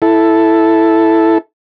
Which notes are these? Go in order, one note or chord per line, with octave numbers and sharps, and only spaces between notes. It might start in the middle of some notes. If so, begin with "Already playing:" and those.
E4 A4